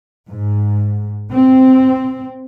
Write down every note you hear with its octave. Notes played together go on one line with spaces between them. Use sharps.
G#2
C4